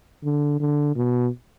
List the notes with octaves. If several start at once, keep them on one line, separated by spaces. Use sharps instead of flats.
D3
D3
B2